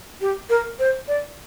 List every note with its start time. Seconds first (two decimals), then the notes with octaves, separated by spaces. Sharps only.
0.21 G4
0.50 A#4
0.80 C5
1.08 D5